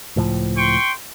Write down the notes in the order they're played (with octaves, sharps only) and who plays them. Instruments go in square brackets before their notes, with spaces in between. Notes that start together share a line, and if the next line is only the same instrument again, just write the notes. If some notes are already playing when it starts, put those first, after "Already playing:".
[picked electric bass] C#2 A2 F3
[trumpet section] G5 C6 C#6